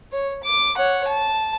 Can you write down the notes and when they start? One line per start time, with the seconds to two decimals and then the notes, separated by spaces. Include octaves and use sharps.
0.12 C#5
0.44 D6
0.77 C#5 F#5
1.07 A5